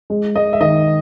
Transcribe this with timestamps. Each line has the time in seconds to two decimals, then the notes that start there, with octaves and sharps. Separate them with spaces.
0.10 G#3
0.36 G#3 D#5
0.53 E5
0.61 D#3 D#5